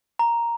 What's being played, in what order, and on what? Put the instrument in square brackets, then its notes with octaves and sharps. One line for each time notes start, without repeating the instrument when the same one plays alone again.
[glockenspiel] A#5